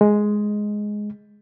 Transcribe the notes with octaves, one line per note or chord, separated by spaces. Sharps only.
G#3